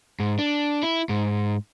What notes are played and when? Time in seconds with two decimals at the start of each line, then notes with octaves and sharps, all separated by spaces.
0.20 G#2
0.39 D4
0.83 E4
1.09 G#2